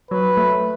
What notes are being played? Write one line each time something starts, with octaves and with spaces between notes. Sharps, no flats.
F#3 B4
A3